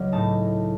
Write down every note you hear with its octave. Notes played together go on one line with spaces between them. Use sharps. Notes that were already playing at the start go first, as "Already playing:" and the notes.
Already playing: C#2 F#3 C#4
A2 A3 D#4 A5